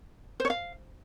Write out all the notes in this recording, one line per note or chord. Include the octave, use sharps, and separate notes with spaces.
C5
C#5
F5